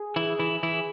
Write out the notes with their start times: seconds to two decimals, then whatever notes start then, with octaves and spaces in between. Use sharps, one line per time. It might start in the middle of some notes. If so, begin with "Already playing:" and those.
Already playing: G#4
0.16 E3 E4
0.39 E3 E4
0.63 E3 E4